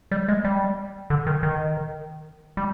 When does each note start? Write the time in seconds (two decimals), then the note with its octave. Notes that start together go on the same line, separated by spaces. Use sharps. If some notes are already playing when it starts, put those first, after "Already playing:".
0.11 G3
0.28 G#3
0.44 G3
1.10 D3
1.27 D#3
1.43 D#3
2.57 G3